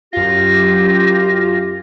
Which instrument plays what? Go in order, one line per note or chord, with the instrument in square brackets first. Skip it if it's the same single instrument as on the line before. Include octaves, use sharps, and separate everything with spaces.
[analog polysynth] F#2 F4 [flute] G4 [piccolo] A#6